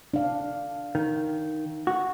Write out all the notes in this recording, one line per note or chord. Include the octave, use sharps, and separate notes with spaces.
D4 F5
D#3
F#4